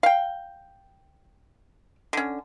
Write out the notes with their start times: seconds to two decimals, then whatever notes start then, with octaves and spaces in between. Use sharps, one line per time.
0.03 F5 G5
2.13 D3 C#4